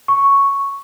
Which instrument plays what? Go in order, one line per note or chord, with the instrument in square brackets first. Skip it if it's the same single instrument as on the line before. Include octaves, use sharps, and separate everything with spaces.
[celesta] C#6